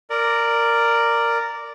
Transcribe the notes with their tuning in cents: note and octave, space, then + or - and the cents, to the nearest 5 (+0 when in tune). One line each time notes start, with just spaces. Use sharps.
A#4 -10 D5 +0